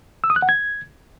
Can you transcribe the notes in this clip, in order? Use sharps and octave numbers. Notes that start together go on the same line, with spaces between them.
E6
D#6
F#6
F#5
G#6